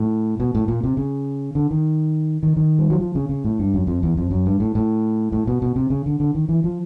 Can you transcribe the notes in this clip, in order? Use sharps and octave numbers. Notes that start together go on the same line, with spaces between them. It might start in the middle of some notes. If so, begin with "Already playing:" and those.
Already playing: A2
B2
A2
A#2
C3
C#3
D3
D#3
D#3
D#3
G3
F#3
F3
C#3
C#3
A2
G2
F#2
F2
E2
F2
F#2
G2
A2
A2
A2
B2
B2
C3
C#3
D3
D3
D#3
E3
F3